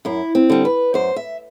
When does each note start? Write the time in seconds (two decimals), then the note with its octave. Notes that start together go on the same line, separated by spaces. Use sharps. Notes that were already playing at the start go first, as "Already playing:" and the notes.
0.05 F#2 E4
0.35 C4
0.50 D3 G3
0.65 B4
0.94 F#2 C5
1.16 E5